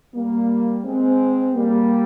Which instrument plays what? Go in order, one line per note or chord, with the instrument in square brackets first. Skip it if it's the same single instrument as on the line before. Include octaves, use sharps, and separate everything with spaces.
[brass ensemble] G3 A#3
G#3 C4
G3 A#3